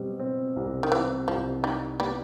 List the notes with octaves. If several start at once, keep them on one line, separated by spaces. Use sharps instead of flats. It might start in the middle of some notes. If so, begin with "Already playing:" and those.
Already playing: B2 G3 C4
C4
C2
D#3
E3 C4
C2 F3
G3 D#4
G3 B3